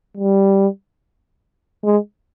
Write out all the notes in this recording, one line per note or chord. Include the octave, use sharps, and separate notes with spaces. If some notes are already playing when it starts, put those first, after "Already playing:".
G3
G#3